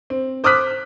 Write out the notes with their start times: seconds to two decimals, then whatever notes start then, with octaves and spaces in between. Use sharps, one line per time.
0.10 C4
0.44 C5 D6 D#6 F6 F#6 B6